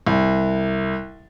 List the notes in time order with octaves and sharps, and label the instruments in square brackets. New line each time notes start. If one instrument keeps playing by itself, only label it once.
[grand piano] C2